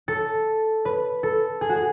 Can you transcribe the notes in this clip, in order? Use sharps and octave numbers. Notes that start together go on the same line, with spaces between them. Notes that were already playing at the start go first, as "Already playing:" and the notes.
A4
B4
A4
G#4
F#4
G#4